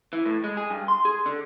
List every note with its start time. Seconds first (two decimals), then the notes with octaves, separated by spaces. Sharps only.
0.13 E3
0.25 A2
0.44 G#3
0.57 G#4
0.70 G2
0.88 C6
1.05 G#4
1.26 D3